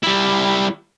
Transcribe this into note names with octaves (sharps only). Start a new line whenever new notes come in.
G3 E4